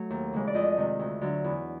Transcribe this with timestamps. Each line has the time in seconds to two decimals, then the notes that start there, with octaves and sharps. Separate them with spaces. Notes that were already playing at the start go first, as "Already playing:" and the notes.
Already playing: F#3 A3
0.10 D#2
0.33 C#3 E3 G#3
0.47 D5
0.54 F2 D#5
0.77 C3 D#3 G#3
0.99 D2
1.21 D3 F#3
1.44 E2